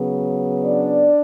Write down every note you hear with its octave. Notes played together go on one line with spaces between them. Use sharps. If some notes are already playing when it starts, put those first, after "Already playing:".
Already playing: C#3 F#3 B3
D4 D5